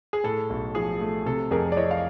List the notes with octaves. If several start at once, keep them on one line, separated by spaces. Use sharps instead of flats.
G#4
A2 A4
B1
F3 G#4
A3
C3 A4
F2 G#4 A#4
D5
E3 C#5 D#5
F5